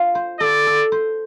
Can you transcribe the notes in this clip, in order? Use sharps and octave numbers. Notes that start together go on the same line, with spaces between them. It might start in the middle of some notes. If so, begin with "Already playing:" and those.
Already playing: F4
C5
A4 D5
A4
C5